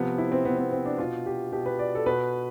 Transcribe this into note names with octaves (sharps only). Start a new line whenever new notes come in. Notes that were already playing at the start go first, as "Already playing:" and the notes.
Already playing: C3 F3 B3
E4
C4
C3 F3 B3
B3
C4
D4
B2 F4
G4
B2 G4
B4
D5
A4
B2 B4